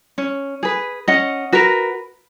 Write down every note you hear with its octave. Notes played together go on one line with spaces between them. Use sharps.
C#4
G#4 B4
C#4 D#5 F#5
F#4 A#4 B4